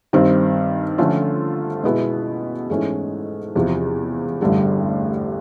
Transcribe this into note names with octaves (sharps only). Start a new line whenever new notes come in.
G2 D#3 G3 C4
D3 F3 A3 C#4 F4
B2 G#3 B3 E4
G#2 E3 A3 C#4
E2 C3 F3
A1 G2 D3 G3